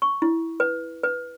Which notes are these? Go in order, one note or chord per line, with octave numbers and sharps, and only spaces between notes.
C#6
E4
B4
B4